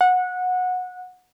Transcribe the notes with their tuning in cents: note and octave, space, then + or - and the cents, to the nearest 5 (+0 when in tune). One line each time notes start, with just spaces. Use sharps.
F#5 -20